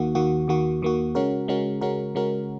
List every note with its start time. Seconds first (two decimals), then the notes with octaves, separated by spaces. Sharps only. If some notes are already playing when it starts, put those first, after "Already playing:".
Already playing: D#2 D#3 A#3 F#4
0.15 D#2 D#3 A#3 F#4
0.48 D#2 D#3 A#3 F#4
0.82 D#2 D#3 A#3 F#4
1.15 C#3 G#3 C#4 F#4 A#4
1.48 C#3 G#3 C#4 F#4 A#4
1.81 C#3 G#3 C#4 F#4 A#4
2.15 C#3 G#3 C#4 F#4 A#4